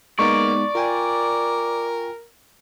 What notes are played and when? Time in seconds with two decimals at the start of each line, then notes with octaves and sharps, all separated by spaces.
0.19 G#3 A#3 B3 D#4 D5 C#6
0.75 F4 A#4 G5 G#5